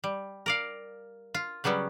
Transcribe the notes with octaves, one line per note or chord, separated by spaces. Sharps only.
G3
A#4 D5 F5
F4
C#3 F#3 G3 B3 C#4